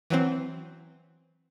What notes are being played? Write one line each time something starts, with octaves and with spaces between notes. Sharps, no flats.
E3 F#3 C4